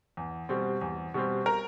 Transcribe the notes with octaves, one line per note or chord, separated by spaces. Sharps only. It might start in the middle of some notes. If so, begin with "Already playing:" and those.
E2
B2 G3 C4
E2
B2 G3 C4
A#4